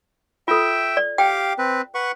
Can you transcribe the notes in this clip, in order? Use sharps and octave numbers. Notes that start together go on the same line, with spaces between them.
F4 A4 E5 G5
D5
G4 F5 G5 D6
C4 B4
B4 F#5 C#6